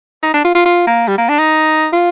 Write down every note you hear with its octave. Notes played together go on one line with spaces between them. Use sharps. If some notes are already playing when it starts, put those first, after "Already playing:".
D#4
D4
F4
F4
F4
A#3
G3
A#3
D4
D#4
F4